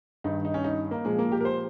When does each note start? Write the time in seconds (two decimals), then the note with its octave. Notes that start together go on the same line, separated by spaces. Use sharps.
0.24 G2 D#3 D#4
0.45 D#4
0.54 C#4
0.64 D#4
0.91 A#3
1.05 A#2 F3 G#3
1.19 A#3
1.32 G4
1.41 A#4
1.45 C5